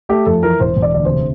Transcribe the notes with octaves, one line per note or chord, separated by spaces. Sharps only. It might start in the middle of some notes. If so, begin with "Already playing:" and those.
A3 G4
F2 A4
E3 A#4
E1 C5
E1
D5
D2 D5
C3 C5